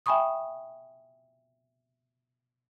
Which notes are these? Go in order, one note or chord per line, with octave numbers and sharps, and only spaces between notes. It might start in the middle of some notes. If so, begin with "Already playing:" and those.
E5 G5 G#5 B5 C#6 D#6